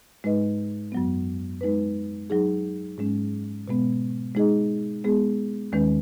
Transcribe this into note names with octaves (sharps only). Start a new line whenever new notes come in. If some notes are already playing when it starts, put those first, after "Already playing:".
G#2 G#3 D#4 B4 D#5
F#2 F#3 B3
G#3 D#4 B4
F#3 D#4 G#4
G#2 G#3 C#4
B2 G#3 B3
G#3 D#4 G#4 D#5
G#3 B3 G#4
D#2 D#3 G#3 C#4 B4